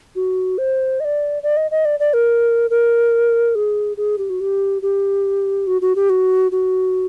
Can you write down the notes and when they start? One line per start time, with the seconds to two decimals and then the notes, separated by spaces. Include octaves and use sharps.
0.16 F#4
0.58 C5
1.00 D#5
1.05 D5
1.43 D5
1.57 D#5
1.71 D#5
1.85 D5
2.00 D5
2.14 A#4
2.70 A#4
3.55 G#4
3.97 G#4
4.18 G4
4.30 F#4
4.40 G4
4.82 G4
5.67 F#4
5.82 F#4
5.96 G4
6.10 F#4
6.52 F#4